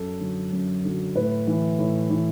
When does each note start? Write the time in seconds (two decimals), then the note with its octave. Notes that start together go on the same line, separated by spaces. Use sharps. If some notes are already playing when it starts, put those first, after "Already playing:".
Already playing: F#2 A4
0.20 D3 F#3
0.52 F#2
0.84 D3 F#3
1.15 A2 B4
1.47 E3
1.79 A2
2.10 E3